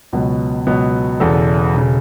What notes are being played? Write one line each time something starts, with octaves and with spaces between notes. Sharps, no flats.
C#2 B2 F#3 B3
C#2 B2 F#3 B3
E1 E2 C#3 A4
E1 C#3